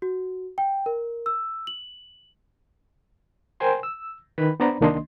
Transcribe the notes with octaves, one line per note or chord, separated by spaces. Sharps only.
F#4
G5
A#4
E6
F#7
A#4 C5 G5 G#5 C6
E6
D#3 B4 B5
B3 D4 C5 D5 A#5 B5
C2 D#3 A#3 D4 D#5 C6